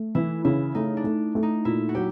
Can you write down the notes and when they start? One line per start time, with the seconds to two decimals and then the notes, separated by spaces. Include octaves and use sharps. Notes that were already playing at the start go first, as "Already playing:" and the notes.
Already playing: A3
0.15 E3 E4
0.45 C#3 E4
0.75 A3 D#4
0.97 D4
1.04 A3
1.35 A3
1.43 D#4
1.65 A#2 E4
1.89 F#4
1.95 F#3 G4